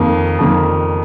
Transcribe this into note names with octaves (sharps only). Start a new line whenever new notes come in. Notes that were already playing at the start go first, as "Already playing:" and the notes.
Already playing: F2 D#3 A#3
F2 D#3 A#3